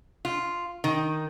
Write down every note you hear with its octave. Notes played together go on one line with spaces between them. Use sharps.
F4
D#3